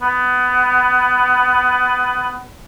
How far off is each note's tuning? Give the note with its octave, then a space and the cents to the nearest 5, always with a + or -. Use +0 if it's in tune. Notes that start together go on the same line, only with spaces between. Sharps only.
B3 +20